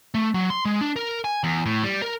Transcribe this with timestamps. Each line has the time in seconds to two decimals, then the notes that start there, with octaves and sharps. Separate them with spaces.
0.15 A3
0.34 F#3
0.50 C6
0.65 G#3
0.81 D4
0.96 A#4
1.25 G#5
1.44 E2
1.66 A2
1.84 G3
2.02 A#4